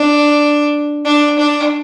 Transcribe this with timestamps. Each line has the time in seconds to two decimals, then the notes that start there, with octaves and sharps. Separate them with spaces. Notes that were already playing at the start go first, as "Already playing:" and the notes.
Already playing: D4
1.05 D4
1.39 D4